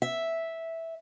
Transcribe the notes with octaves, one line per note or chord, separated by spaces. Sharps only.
E5